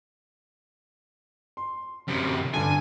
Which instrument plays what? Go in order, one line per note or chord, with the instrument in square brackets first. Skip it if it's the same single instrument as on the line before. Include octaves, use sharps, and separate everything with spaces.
[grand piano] C6
[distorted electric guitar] F#2 C3
[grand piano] G2 D3 [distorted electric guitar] G#5